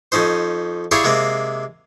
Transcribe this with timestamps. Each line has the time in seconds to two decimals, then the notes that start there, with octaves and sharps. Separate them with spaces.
0.12 F2 C#4 D#4 C5
0.91 E4 G4 G#4 C#5 D5 F5
1.04 C3 G#3 A#3 C4